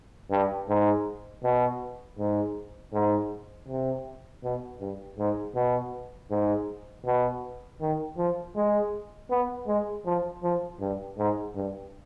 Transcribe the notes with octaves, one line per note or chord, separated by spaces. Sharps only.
G2
G#2
B2
G#2
G#2
C3
B2
G2
G#2
B2
G#2
B2
D#3
F3
G#3
B3
G#3
F3
F3
G2
G#2
G2